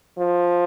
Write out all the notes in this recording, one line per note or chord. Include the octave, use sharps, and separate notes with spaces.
F3